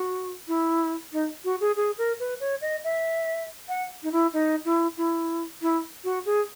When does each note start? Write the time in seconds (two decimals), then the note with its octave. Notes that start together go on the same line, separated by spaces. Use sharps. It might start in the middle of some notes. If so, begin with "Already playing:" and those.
Already playing: F#4
0.48 E4
1.13 D#4
1.45 F#4
1.61 G#4
1.76 G#4
1.98 A#4
2.20 B4
2.40 C#5
2.61 D#5
2.84 E5
3.69 F#5
4.03 D#4
4.12 E4
4.33 D#4
4.65 E4
4.97 E4
5.62 E4
6.04 F#4
6.26 G#4